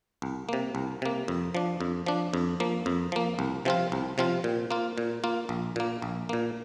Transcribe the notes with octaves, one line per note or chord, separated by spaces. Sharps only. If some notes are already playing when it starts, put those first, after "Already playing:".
C2
C3 A#3
C2
C3 A#3
F2
F3 D4
F2
F3 D4
F2
F3 A#3
F2
F3 A#3
C2
C3 F3 C4 F4
C2
C3 F3 C4 F4
A#2
A#3 F4
A#2
A#3 F4
A#1
A#2 A#3
A#1
A#2 A#3